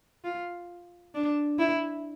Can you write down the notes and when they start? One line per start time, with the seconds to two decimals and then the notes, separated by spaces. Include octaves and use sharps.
0.24 F4
1.14 D4
1.59 E4